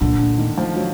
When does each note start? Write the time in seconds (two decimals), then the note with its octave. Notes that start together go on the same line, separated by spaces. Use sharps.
0.01 A#2 D3
0.19 D3
0.38 D#3
0.57 F3
0.76 F#3